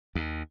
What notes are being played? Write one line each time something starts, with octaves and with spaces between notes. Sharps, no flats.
D#2